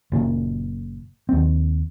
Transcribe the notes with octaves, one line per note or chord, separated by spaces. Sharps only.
F#1 A#2 C#3
D#2 C4